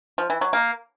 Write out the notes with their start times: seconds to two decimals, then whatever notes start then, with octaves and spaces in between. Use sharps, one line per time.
0.18 F3
0.30 E3
0.41 F#3
0.53 A#3